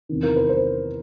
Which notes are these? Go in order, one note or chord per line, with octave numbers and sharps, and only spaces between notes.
E2 C3 D#3
A#4
B4
C5